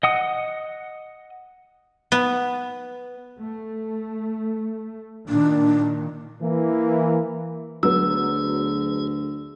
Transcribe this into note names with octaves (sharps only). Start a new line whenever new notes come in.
D#5 F#5 D#6
B3
A3
A#2 D#3 D4
E3 A#3
D2 F#3 B3 G#4 E6